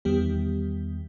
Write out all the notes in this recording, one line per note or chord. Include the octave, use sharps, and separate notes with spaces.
E2 D#3 G3 B3 G4